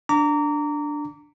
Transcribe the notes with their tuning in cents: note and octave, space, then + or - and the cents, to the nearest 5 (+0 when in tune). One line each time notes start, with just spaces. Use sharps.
D4 +0 A#5 -20 D6 -35